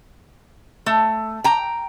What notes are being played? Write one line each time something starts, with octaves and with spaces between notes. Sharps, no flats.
A3
G5 A#5